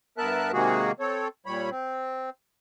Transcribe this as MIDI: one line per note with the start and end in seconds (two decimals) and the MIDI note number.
0.18 0.52 43
0.18 0.52 59
0.18 0.52 70
0.18 0.52 76
0.18 0.52 81
0.18 0.52 90
0.53 0.92 48
0.53 0.92 51
0.53 0.92 56
0.53 0.92 58
0.53 0.92 66
0.53 0.92 68
1.00 1.28 60
1.00 1.28 69
1.00 1.28 73
1.46 1.70 46
1.46 1.70 55
1.46 1.70 73
1.46 1.70 83
1.70 2.30 60